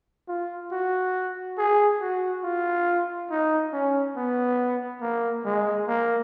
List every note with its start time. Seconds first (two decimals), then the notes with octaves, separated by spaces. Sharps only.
0.28 F4
0.72 F#4
1.58 G#4
2.01 F#4
2.44 F4
3.31 D#4
3.73 C#4
4.16 B3
5.02 A#3
5.45 G#3
5.88 A#3